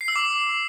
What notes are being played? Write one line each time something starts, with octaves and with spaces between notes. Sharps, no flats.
C7
E6
D6